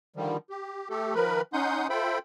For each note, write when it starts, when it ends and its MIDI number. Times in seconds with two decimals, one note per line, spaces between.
0.16 0.37 50
0.16 0.37 51
0.16 0.37 53
0.16 0.37 55
0.50 0.89 67
0.90 1.15 57
0.90 1.15 67
0.90 1.15 69
1.15 1.41 51
1.15 1.41 53
1.15 1.41 70
1.15 1.41 71
1.15 1.41 83
1.53 1.87 61
1.53 1.87 63
1.53 1.87 78
1.53 1.87 84
1.53 1.87 87
1.53 1.87 91
1.89 2.19 65
1.89 2.19 69
1.89 2.19 72
1.89 2.19 76
1.89 2.19 79
1.89 2.19 83